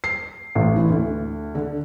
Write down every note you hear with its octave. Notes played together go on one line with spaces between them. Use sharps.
C7
A1
E3
D2
D3